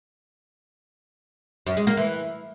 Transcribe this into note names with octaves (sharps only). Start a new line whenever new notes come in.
F#2
G#3
A#3
E3